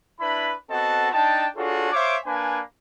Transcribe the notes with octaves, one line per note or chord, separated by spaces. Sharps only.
D4 E4 B4 B5
B3 C4 F#4 A4 D#5 A5
D4 D#4 G5 A5
D4 F4 F#4 G#4 A4 C#5
C5 C#5 E5 F5 D6
A#3 D4 B4 G#5